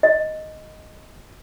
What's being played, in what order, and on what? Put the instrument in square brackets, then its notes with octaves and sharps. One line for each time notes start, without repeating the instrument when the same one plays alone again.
[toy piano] D#5